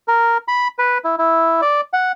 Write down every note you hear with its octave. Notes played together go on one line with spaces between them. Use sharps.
A#4
B5
B4
E4
E4
D5
F#5